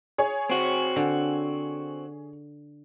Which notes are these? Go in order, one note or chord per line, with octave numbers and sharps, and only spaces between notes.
G#4 C#5
C4 F#4
D3